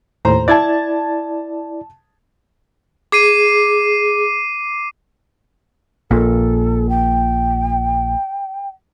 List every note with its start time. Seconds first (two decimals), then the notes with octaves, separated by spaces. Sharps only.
0.25 D#2 A2 C5 A#5
0.48 E4 D5 A5 G#6 A6
3.12 G#4 D6 C7 D#7
6.11 A#1 A#2 A4
6.89 G5